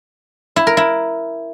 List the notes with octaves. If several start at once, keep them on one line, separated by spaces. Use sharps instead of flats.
E4
A#4
E4